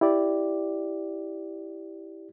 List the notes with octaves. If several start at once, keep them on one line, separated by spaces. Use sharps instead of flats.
E4 G4 D5